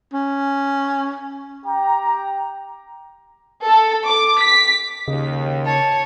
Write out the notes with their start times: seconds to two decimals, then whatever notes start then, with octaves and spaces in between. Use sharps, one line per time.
0.13 C#4
1.66 G4 G5 A#5
3.66 A4
4.08 D6
4.40 B6
5.08 D#2 C#3 D#5
5.66 C#5 A5